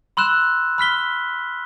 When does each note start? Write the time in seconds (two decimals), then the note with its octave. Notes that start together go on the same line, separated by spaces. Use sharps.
0.17 B5 C6 E6 F#6 E7
0.78 B5 F6 B6 G7